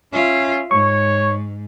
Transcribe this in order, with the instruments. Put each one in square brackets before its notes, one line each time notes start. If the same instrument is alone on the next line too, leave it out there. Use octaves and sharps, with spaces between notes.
[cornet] C#4 [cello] F4 E5
[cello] G#2 [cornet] C#5 [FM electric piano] C#6